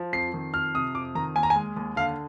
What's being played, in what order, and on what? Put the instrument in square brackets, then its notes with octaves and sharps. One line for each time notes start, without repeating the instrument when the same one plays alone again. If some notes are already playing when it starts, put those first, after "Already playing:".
Already playing: [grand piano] F3
F2 C7
D#3
F2 F6
C3 D#6
F2 D6
D#3 A#5
D#2 G#5
A#5
G#5
G#3
D#2
D3 F5